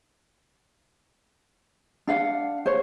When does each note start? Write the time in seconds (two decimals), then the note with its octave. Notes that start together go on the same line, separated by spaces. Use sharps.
2.07 D4 F5 F#5
2.66 C5 C#5